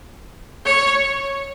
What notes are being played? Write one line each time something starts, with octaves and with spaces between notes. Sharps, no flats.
C#5